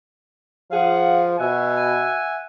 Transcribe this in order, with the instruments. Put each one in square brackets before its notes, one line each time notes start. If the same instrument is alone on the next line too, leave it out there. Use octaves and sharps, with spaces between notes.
[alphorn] F3 [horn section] G#4 F5 F#5
[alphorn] B2 [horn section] E5 F#5 G#5